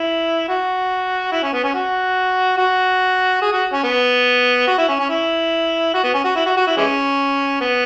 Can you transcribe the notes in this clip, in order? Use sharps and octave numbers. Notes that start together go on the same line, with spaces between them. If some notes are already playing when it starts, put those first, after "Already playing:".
Already playing: E4
F#4
E4
C#4
B3
C#4
F#4
F#4
G#4
F#4
C#4
B3
F#4
E4
C#4
C#4
E4
F#4
B3
C#4
F#4
E4
F#4
F#4
E4
E3 G#3 C#4
B3